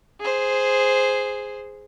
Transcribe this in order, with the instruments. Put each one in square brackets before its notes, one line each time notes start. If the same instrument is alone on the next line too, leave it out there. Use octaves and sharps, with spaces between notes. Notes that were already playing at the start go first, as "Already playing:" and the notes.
[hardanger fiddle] G#4 C5